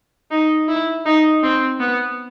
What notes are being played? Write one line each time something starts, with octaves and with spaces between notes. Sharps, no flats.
D#4
E4
D#4
C4
B3